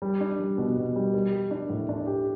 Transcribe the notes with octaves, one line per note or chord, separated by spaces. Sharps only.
G3
D4
G3
B2
B2
G3
G3
G4
D4
A2
D4
G4